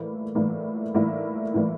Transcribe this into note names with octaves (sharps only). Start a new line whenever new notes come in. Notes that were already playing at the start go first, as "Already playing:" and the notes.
Already playing: A2 E3 G3 A#3 E4
A2 E3 G3 A#3 E4
A2 E3 G3 A#3 E4
A2 E3 G3 A#3 E4